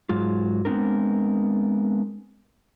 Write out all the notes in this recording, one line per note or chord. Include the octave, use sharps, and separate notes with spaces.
G#2 F#3 G#3 F4
G#3 B3 C4 D4 A#4